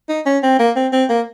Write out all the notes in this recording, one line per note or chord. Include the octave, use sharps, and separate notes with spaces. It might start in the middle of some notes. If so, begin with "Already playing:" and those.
D#4
C#4
C4
A#3
C4
C4
A#3